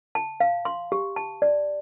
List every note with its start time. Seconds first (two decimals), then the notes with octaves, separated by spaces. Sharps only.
0.15 A5
0.40 F5
0.65 C6
0.92 G4
1.16 A5
1.42 D5